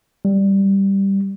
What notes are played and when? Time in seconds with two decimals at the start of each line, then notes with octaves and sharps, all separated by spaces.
0.25 G3